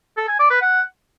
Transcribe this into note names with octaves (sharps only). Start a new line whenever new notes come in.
A4
G#5
D5
B4
F#5